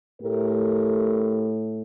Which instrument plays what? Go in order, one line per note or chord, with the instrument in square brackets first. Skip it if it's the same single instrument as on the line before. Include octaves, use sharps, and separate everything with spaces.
[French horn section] A2 A3 G4 A#4